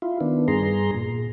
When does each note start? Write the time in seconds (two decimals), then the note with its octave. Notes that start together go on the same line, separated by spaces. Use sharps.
0.02 E4 F4
0.21 D#3 B3 D4
0.48 G2 G#4 A#5 C6
0.94 A#2